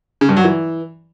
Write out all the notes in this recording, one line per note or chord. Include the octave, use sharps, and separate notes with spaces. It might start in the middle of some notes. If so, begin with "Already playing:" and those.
C#3
G2
F#3
E3